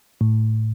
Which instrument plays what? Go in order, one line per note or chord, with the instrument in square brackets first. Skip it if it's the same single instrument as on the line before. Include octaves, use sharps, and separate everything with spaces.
[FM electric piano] A2